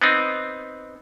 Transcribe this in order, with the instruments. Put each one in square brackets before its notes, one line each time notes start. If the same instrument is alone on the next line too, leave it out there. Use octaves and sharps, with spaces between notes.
[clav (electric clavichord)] B3 C4 D#4